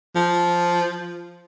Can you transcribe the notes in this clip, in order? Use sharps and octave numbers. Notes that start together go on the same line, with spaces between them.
F3